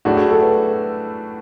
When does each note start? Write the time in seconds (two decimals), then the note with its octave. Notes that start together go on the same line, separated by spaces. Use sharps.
0.05 A2 F#3 A3 D4 F#4 G#4
0.17 G#4
0.31 A4
0.42 B4